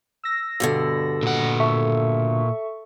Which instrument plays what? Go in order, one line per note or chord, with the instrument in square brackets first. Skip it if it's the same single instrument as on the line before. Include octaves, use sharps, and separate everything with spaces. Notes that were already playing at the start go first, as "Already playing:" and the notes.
[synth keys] E6 A#6
[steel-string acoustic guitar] G2 B2 D3
[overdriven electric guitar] A#2 F#5
[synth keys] A4 E5 C#6